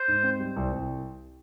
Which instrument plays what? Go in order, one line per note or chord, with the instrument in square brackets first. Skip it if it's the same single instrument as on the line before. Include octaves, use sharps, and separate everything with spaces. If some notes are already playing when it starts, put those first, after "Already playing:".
Already playing: [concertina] C5
[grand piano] G#2
C4
G3
C2
C2